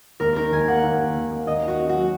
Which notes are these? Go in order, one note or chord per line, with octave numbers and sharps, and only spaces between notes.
D#2 A#4
D#3 A#4
D#2 G#5
A#3 F#5
D#2
D#3
D#2
A#3
D#2 D#5
D#3 F#4
C#4
F#3 F#4